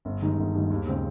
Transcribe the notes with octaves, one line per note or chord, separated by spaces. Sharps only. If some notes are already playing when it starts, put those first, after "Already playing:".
G1
G2 D#3 G#3
G1
G2 D#3 G#3
D#2
C#3 G#3 C4